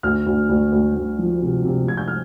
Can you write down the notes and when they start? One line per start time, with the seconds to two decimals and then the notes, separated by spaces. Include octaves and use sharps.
0.03 D2 F6
0.26 D2
0.49 D2
0.72 D2
0.95 D2
1.19 F3
1.42 C3
1.65 C3
1.88 C3 G#6
1.97 G6
2.08 F6